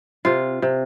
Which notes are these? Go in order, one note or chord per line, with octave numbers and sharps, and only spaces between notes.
C3 F4
C3